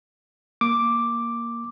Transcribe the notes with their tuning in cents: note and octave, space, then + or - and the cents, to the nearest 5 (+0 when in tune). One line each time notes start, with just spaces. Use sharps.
A#3 +0 D6 +0